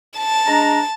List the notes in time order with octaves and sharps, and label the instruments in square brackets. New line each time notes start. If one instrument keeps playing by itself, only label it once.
[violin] A5
[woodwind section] G#3 D4 A#5